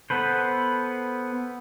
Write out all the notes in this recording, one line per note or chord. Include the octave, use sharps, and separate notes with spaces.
B3 A4 B4 C5